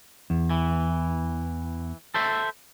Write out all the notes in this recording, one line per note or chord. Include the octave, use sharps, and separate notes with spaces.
E2
E3
A4 C5 E5